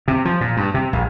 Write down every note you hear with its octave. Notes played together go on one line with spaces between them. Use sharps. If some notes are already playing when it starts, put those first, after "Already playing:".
C3
F3
A#2
G2
C3
A#1